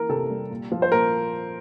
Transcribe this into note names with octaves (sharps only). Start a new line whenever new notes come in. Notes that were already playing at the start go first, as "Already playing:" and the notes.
Already playing: E3 A#3 A#4
C3 A4
G3
A#2
F3
C5
A#2 A#4